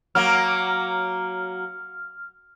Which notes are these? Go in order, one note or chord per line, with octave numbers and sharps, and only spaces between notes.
F#3 A#3 F6